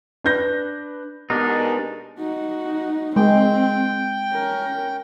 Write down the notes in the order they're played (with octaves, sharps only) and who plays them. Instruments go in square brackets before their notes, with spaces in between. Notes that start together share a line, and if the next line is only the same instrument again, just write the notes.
[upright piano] D4 B4 G6 A#6
[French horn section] B2 G#3 [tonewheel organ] B3 G4 A#4 [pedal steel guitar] D4 D#4
[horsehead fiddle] D#4 F#4
[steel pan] G#3 [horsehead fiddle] C4 [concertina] G5
[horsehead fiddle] C#4 A#4